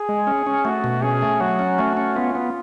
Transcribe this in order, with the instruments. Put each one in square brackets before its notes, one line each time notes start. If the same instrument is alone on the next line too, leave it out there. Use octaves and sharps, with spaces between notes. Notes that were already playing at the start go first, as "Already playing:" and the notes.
Already playing: [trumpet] G#4
[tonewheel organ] G#3
C#4
C#4
[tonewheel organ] A3 [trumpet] F#4
[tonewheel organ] B2
[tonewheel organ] C#4 [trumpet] G#4
[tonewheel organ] A3
[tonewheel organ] F#3 [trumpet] F#4
[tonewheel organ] C#4
A3
C#4
[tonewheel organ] B3 [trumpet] F4
[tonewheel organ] B3